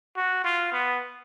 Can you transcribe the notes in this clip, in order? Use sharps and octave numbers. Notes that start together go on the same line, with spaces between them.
F#4
F4
B3